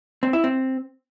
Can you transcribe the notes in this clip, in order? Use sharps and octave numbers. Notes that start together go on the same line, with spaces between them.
C4
E4
C4